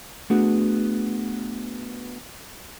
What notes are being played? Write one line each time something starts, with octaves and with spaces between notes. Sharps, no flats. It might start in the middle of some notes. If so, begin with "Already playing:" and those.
A3 B3 D4 F#4 G#4